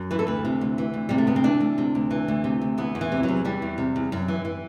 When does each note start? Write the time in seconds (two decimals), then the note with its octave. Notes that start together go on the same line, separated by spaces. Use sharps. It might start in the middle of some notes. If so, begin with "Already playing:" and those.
Already playing: F#2
0.11 E3 B4
0.19 A4
0.27 D2 B4
0.45 C3
0.61 D2
0.78 E3
0.94 D2
1.09 C3 G3
1.18 A3
1.27 D2 B3
1.36 C4
1.44 E3 D4
1.60 D2
1.78 C3
1.95 D2
2.11 E3
2.28 D2
2.44 C3
2.61 D2
2.78 E3 B3
2.95 E2
3.01 E3
3.12 C3
3.23 F#3
3.28 E2
3.45 E3 G3
3.62 E2
3.78 C3
3.96 E2
4.12 F#2
4.28 E3
4.45 E3